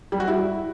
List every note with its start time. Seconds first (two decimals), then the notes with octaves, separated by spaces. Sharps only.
0.12 G3
0.20 F#4
0.28 E4